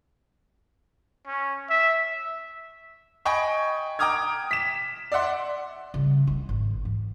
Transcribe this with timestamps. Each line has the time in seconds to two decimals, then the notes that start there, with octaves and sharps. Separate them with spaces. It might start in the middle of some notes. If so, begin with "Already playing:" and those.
1.27 C#4
1.70 E5
3.25 D#5 G5 G#5 B5 C#6
3.99 G5 A#5 D6 D#6 F6 G#6
4.51 B6 E7
5.12 D5 E5 F#5 C6
5.94 C#3 G3
6.27 D#4 E4
6.49 G#1
6.85 E3